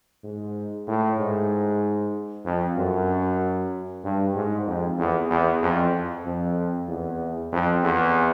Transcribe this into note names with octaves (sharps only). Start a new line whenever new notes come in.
G#2
A2
G#2
F2
F#2
G2
G#2
F2
E2
E2
F2
F2
E2
F2
E2